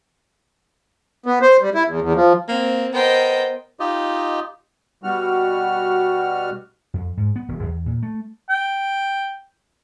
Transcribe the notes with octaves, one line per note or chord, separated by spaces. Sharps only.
B3
C5
G3
E4
E2
E2
F3
A#3 C4
B3 A#4 C5 D#5 G5
D#4 F4 G4 D#5
B2 G3 F#4 F6
F2
G#2
B3
E1
E2
A#2
A3
G5